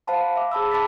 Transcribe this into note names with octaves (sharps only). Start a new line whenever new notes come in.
C5 F5 F#5 A5 B5
E5 D6
G#4 A5 B5 E6
A5 B5 D6 A6 B6